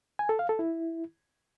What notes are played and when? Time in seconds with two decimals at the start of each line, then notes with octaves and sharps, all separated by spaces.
0.19 G#5
0.29 A4
0.39 F5
0.49 A4
0.59 E4